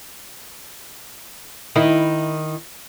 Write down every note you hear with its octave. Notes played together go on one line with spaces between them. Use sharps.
D#3 E4